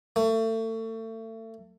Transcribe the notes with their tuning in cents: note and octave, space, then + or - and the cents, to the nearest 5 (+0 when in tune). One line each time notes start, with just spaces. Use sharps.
A3 +30